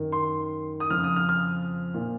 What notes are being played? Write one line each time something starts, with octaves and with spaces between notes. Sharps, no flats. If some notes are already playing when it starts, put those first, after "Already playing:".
Already playing: F#2 D#3
C6
D#6
F2 C#3 F3 F6
D#6
F6
F6
A#2 F3